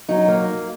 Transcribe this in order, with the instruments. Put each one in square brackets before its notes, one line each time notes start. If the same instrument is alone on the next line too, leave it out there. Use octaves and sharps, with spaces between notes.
[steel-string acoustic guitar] F#3 D#4
A#3